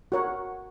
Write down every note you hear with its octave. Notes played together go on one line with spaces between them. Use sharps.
F#4 A#4 C#5 F#5